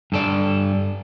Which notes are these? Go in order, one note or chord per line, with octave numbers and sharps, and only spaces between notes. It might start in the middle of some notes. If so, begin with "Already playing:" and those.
G2 A4 D5